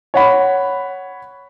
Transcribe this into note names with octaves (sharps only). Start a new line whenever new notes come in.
C#5 F#5 B5